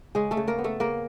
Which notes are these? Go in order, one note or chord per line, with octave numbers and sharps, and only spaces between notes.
C#3 G#3 G#4
A3 A4
C#3
A#3 A#4
B3
A3 A4
C#3 A#3 A#4